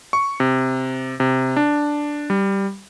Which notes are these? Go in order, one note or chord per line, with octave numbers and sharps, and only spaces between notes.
C#6
C3
C3
D4
G3